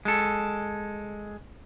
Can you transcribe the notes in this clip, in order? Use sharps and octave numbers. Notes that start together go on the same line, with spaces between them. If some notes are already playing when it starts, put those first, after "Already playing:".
G#3 A4